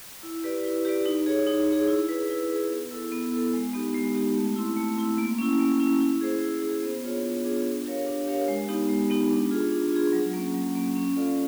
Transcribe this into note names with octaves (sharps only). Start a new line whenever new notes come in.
E4
G4 B4 D5
E4
G4 B4 D5
D#4
G#4 C#5
D#4
G#4 C#5
E4
G#4 B4
E4
G#4 B4
B3
E4 A4
B3
E4 A4
G#3
B3 D#4 G4
G#3
B3 D#4 G4
A3
C4 E4
A3
C4 E4
A#3
C#4 E4
A#3
C#4 E4
E4
G#4 C5
E4
G#4 C5
B3
D4 F4 G#4 C#5
B3
D4 F4 G#4 C#5
D4
G4 A#4 C#5 F5
D4
G4 A#4 C#5 F5
G#3
B3 D#4 G4
G#3
B3 D#4 G4
D4
F4 G#4
D4
F4 G#4
F#3
A#3 C#4
F#3
A#3 C#4
C#4
F4 A4 D5 F5